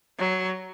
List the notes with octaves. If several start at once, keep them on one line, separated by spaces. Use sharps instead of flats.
F#3